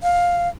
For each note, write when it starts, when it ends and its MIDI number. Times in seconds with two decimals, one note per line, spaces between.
0.03 0.49 77